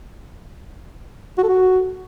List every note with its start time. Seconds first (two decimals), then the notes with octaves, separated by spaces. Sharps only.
1.38 F#4
1.43 A4
1.49 F#4